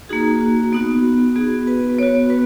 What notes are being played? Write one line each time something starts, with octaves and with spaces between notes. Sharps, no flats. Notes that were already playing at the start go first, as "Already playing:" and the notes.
A#3 D#4 F#4 G#4
F#4
B3 D#4 F#4
B3 F#4 G#4
B4
B3 F#4 C#5
B4